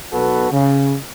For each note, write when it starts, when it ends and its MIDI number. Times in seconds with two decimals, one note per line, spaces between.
0.12 0.51 35
0.12 0.51 47
0.12 0.51 66
0.12 0.51 69
0.12 0.51 71
0.52 0.95 49